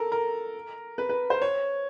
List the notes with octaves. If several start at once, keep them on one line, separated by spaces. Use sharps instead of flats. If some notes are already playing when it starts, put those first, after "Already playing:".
Already playing: A4 A#4
A#4
B4
B4
C5
C#5